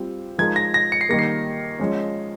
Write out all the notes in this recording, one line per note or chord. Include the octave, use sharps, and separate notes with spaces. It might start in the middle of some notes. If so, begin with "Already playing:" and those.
Already playing: G3 C4 F4
F3 G#3 D#4 A#4 G#6
A#6
A#6
C#7
C7
D#3 G3 A#3 A#6
C7
F3 G#3 C#4